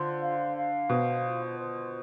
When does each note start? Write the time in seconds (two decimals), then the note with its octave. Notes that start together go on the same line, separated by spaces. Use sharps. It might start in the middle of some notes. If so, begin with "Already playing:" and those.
Already playing: D3 F4 C5
0.21 F5
0.56 F5
0.89 B2 C5
1.25 F4
1.58 C5